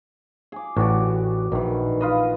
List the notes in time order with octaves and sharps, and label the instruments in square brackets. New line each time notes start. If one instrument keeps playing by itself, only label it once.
[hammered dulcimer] G#4 D6
[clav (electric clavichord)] A1 A2 [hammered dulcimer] F#4 D5
[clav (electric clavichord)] A#1 [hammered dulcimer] D#3 E3
[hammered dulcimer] F4 B4 D#5